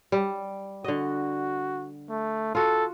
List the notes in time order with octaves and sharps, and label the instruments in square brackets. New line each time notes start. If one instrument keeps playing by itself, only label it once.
[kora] G3
[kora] D3 D#5 [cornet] F#4
[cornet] A3
[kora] F4 F#4 [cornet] A4